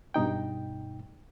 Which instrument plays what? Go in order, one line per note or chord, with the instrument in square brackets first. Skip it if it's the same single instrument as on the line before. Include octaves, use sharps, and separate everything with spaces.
[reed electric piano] G2 B2 D#4 G5